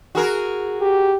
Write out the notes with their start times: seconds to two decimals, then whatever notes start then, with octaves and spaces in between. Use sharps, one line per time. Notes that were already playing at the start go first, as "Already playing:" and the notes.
0.15 F#4 G#4 A#4
0.81 G4